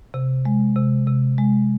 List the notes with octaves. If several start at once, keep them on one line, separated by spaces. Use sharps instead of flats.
C3
G#3
C3
C3
G#3